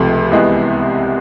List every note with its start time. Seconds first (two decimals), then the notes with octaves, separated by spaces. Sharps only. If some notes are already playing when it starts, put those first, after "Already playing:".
Already playing: C#2 C3 F3 A3
0.32 C2 C3 E3 G#3 B3